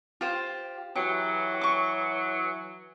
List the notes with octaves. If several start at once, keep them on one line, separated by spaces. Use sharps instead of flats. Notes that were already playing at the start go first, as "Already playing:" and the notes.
F4 G4 C5
E3 F#3 G4
C#6 D6